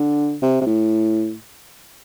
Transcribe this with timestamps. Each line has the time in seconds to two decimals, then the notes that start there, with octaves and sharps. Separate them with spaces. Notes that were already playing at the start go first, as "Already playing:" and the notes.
Already playing: D3
0.42 C3
0.61 C3
0.67 A2